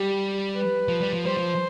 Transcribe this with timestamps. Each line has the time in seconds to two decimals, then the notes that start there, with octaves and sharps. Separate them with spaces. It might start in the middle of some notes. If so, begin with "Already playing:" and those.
Already playing: G3 G4
0.55 B4
0.88 F3
1.01 G3
1.13 F3
1.23 G3 C5
1.37 F3